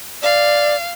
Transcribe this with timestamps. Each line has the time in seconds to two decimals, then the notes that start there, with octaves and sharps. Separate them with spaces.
0.23 D5 F5